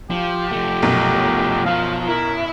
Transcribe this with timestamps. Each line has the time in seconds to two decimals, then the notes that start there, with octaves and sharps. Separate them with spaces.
0.10 F3 G4
0.51 F3 A3
0.82 B1 F#2 B2
1.66 F3 F5
2.08 E4 A#4